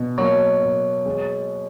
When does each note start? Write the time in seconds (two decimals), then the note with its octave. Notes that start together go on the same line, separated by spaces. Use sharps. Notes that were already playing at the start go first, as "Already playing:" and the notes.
Already playing: B2
0.18 F#3 A#3
0.62 B2
1.06 G#3